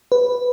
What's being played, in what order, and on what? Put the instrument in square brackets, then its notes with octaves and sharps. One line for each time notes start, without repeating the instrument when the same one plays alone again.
[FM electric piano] B4